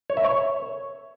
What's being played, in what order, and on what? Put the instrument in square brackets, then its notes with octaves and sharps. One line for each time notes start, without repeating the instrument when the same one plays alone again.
[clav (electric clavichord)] C#5
E5
C#5